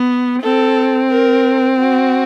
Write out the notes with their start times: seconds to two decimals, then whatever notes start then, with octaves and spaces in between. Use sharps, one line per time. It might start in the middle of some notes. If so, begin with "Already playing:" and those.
Already playing: B3
0.42 C4 A4
1.11 A#4
1.78 F#4